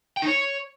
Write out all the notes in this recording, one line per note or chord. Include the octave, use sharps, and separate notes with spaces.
G5
D#4
C#5